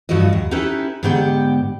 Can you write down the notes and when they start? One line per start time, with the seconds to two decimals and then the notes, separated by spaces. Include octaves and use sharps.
0.09 G2 F3 F#4 A4 D#5
0.33 D#2
0.51 C#4 D#4 E4 G4 A4 B4
1.03 G#2 D3 B3 G4 A#4 G5